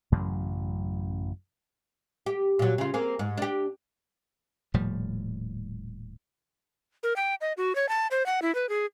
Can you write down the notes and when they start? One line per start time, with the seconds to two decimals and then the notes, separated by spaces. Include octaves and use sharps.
0.12 A1 F#2 C#3 F#3
2.26 G4
2.59 A#2 F#3
2.78 C#3 F4
2.94 A#3 C4 G#4
3.19 G#2
3.38 D4 G4
4.74 D#1 A2 F3 G3
7.03 A#4
7.16 G5
7.41 D#5
7.57 F#4
7.75 C#5
7.89 A5
8.11 C5
8.26 F#5
8.42 E4
8.55 B4
8.69 G#4